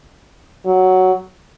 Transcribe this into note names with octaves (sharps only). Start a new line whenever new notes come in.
F#3